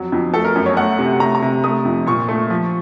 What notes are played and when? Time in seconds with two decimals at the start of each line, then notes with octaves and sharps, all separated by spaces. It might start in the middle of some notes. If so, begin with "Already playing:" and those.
Already playing: F2 F#3
0.12 F2
0.34 A3 A4
0.45 A#4
0.55 F#2
0.66 C#5
0.77 A3 F#5
0.99 C3
1.20 A3 A#5
1.35 A#5
1.42 C3
1.64 A3 D#6
1.85 F2
2.06 A#2 C#6
2.29 A3
2.50 F3